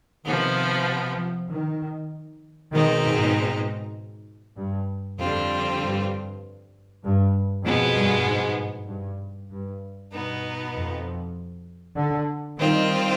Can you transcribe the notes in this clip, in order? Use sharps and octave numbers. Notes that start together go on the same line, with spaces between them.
C3 D#3 F3 B3
F3
D#3
B2 D#3 G#3 C4 D#4
G#2
G2
F2 D3 G3 C4 F4
G2
G2
F2 B2 G#3 B3
G2
G#2
G2
G2
G2 B2 B3 D#4
F2
D3
D#3 G3 C4 F4